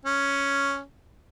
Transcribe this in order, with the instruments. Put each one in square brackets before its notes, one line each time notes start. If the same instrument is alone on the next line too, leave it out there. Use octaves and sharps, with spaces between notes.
[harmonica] C#4